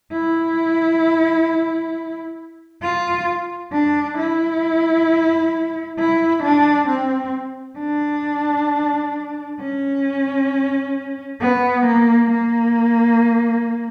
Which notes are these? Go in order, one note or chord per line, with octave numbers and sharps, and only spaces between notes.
E4
F4
D4
E4
E4
D4
C4
D4
C#4
B3
A#3
A#3